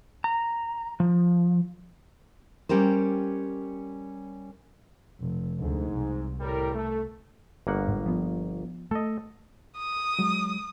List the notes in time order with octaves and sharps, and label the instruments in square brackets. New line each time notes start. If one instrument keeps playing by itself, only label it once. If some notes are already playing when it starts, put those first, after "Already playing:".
[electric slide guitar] A#5
F3
[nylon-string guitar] G3 C#4 G4 A#4 C5
[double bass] F1
[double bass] D2 [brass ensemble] G#2
[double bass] C2
[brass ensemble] A2 G3 A#4
A3
[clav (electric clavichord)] G1 A#3 F#5
[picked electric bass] G#2
F3 B3
[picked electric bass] A3 [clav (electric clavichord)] A4 D#5
[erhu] D#6
[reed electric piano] F#3 G#3